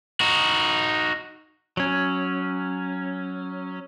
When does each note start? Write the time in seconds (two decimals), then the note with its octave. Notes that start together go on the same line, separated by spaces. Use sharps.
0.21 D#4 F#4
1.77 F#3 C#4